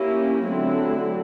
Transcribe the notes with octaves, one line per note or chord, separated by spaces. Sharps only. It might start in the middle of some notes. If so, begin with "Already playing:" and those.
Already playing: A#3 C#4 E4 G4
D3 F#3 A3 C4 E4